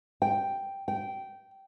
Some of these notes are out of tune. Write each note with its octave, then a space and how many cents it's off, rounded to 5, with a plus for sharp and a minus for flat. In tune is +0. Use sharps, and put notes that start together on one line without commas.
G5 +0
G5 -15